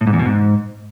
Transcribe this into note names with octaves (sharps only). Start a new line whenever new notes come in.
A2
G#2
E2
B2
G#2